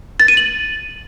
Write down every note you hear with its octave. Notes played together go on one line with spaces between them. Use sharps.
A6
D#7
F#7